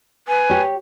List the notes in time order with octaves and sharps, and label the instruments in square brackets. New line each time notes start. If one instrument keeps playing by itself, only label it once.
[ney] B4 [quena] G#5
[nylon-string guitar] G4 C#5